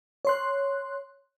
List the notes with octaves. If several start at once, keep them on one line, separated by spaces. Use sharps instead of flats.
C#5 C6 F#6